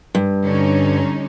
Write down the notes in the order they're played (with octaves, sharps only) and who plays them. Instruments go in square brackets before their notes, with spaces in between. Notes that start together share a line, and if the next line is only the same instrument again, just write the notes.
[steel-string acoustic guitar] G2
[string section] D3 C#4 D#4